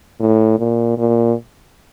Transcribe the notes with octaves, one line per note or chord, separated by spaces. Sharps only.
A2
A#2
A#2